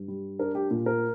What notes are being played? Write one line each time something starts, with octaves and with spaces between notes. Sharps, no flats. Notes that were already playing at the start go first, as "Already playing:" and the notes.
Already playing: G2
G3
D4 A#4
G4
A#2
A#4